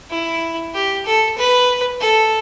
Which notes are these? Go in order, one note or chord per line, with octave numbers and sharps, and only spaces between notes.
E4
G4
A4
B4
A4